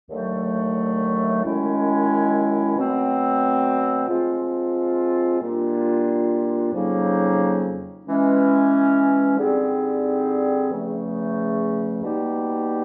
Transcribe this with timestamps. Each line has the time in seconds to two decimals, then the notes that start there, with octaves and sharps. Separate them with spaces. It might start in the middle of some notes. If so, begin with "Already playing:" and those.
0.10 D#2 D3 F#3 A3
1.44 F#2 D#3 G#3 C#4 E4
2.75 B2 F#3 A3 C4
4.08 F3 G#3 C4 F4
5.40 A#2 G3 A#3 D4 F4
6.72 F2 C#3 F#3 A#3 D#4
8.05 E3 G#3 C#4
9.37 D3 G3 C4 D#4 G#4
10.70 E2 C#3 F3 A3
12.02 B2 G3 A#3 D#4 G4